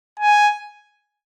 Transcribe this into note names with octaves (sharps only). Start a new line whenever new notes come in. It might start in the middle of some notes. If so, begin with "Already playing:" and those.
G#5